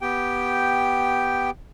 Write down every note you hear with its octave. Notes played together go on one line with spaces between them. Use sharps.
B3 G4 G5